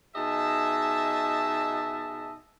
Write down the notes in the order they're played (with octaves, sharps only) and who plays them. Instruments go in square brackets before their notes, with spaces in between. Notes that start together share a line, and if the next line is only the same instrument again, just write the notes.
[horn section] B2 D#4 G#4 D#5 E5 A5